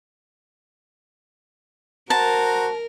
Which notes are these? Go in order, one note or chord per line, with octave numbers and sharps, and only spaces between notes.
F#4 A#4 C5 A5 A#5